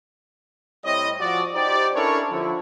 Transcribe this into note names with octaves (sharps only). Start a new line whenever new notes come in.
A2 G3 C4 E4 C#5 D#5
F3 F#4 D5
D#4 G4 C5 D5
C#4 D4 E4 A4 A#4 C#5
D3 F3 E4